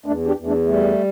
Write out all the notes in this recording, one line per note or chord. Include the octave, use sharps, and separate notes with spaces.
E2 A3 D4
D4 G4
E2
A3 D4
G3 A3